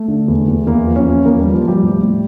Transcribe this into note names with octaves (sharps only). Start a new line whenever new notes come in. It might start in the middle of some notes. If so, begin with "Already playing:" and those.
Already playing: A3 A4
D3
E2
E2
E2 A#3 A#4
F3
C#4 C#5
E2
E2 A#3 A#4
F3 G3 G4
F3 F4
F3 G3 G4
A2
A2